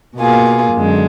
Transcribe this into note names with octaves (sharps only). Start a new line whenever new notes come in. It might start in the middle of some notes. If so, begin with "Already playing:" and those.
B2 A#3 F4 G#4
F#2 D3 G#3